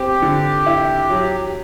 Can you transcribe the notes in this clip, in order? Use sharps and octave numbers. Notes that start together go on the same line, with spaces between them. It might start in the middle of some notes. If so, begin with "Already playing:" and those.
Already playing: C4 G4
D3
E4
F#3